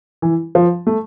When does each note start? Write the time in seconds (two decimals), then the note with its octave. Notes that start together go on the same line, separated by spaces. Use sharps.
0.22 E3
0.55 F3
0.87 A3